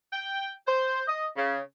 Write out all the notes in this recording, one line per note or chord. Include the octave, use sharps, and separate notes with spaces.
G5
C5
D#5
C#3